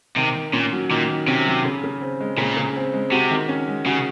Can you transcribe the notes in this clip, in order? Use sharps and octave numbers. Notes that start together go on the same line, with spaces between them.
C3 D#3
D#3
A#2 C#4
F#3
A#2 D#3
D#3
C3 C#4
F#3
C#3
C#3
C4
G#3
A#2 C#3
C#3
C4
G#3
C3 F#4
D#3
C#4
G#3
C#3 F#4